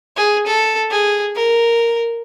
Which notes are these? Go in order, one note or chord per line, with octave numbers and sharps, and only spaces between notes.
G#4
A4
G#4
A#4